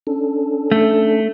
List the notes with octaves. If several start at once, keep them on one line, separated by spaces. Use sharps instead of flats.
C#4 D4 A4
A3